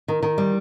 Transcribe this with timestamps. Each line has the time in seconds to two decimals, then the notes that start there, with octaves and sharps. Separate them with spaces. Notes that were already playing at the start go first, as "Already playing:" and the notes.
0.08 D#3
0.23 D#3
0.38 G3